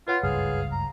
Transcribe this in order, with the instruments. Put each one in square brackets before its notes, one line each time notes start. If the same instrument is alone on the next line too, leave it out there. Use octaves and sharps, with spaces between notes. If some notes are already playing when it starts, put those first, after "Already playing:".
[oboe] F4 [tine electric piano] B4 C#5 F#5
[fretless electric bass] F#1 C#2 G2 [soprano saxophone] G#4 [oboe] F5
[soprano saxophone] A#5